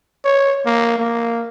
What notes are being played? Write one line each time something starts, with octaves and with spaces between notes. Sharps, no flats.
C#5
A#3
A#3